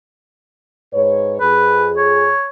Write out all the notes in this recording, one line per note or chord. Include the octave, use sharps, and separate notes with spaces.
G#2 B4 C#5
F2 G#4 B4
C#5